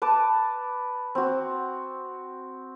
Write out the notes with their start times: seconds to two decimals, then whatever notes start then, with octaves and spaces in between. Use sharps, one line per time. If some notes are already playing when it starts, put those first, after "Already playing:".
0.02 B4 A5 D6
1.15 C4 F#4